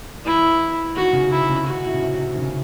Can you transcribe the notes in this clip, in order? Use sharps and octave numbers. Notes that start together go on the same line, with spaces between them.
E3 E4
D#3 F#4
C#3
C3 E4
C#3
D#3 F#4
A2
C#3
C3
C3
D#3
C#3